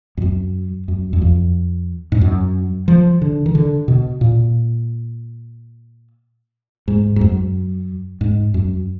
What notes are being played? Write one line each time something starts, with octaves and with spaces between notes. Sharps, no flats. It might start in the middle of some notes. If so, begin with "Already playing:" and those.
F2
F#2
F#2
F#2
F2
G#2
F#2
F3
D3
D#3
D3
B2
A#2
G#2
G#2
F#2
G#2
F#2